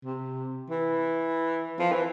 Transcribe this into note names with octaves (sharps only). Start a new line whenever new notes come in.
C3
E3
F3
E3